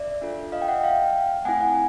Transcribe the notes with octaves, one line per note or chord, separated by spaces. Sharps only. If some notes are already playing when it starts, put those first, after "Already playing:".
Already playing: D5 E5
D4 F4 A4
D#5 F5
G5
E5 F#5
F5 G5
A3 C4 E4 F#5 G#5
F#5 G#5